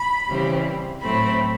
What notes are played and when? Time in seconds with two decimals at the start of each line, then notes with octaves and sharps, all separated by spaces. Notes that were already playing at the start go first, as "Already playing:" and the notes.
Already playing: B5
0.29 C#3 E3 G3 C4
1.02 A2 F#3 A3 C4 B5